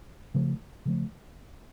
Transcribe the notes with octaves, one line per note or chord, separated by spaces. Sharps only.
C#3 F3 A3
C#3 F3 A3